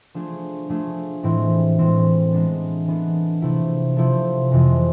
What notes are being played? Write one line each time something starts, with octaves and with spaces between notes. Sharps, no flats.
F3 A3 D4 G#4
F3 A3 D4 G#4
A2 E3 G#3 C4 E4
A2 E3 G#3 C4 E4
E3 G#3 B3 D4 A4
E3 G#3 B3 D4 A4
C3 F3 A3 E4 A4
C3 F3 A3 E4 A4
F2 C3 E3 G#3